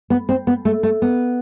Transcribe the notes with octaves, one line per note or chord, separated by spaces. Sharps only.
B3
C4
B3
A3
A3
B3